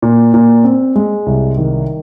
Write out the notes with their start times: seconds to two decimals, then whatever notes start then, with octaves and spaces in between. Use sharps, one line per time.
0.02 A#2
0.34 A#2
0.64 C4
0.96 G#3
1.26 C2
1.57 D#3